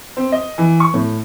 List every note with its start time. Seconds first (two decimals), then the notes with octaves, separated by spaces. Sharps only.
0.17 C4
0.32 D#5
0.58 E3
0.80 C#6
0.94 A2